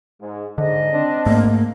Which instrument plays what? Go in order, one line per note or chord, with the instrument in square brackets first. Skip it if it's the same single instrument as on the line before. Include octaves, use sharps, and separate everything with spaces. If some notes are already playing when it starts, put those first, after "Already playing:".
[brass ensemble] G#2
[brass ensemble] G#2 [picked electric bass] D3 [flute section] D#5
[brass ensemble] C4 D4
[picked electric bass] G#2 A3 [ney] A#3